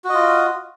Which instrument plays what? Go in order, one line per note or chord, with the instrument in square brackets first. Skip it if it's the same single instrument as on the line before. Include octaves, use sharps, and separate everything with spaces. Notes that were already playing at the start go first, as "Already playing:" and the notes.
[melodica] F#4
D#5
F4